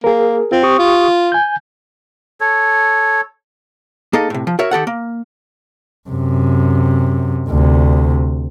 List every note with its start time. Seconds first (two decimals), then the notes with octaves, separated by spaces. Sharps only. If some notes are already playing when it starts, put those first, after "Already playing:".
0.04 A#3 G#4 A#4
0.52 C4 F4
0.63 G4 C#6 D#6
0.78 F4
1.32 G#5 G6
2.41 A4 C#5
4.13 A#3 D#4 G#4 A4 D#5
4.30 A2 C3
4.47 F3
4.59 F#4 A#4 C#5 E5
4.71 D#3 G4 A4 F#5
4.87 A#3
6.09 F#2 C3
7.48 D2 C3